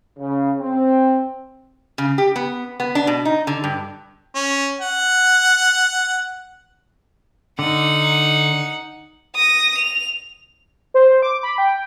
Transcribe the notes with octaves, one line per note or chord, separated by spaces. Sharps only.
C#3
C4
C#3
G4
B3
B3
D4
B2
D#4
D3
G2
C#4
F#5
D3 D#4 F#5
D#6 A#6
F7
C5
D6
B5
G5